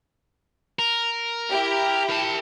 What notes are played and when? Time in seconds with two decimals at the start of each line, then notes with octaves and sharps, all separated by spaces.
0.79 A#4
1.50 E4 G4
2.10 A#4 A5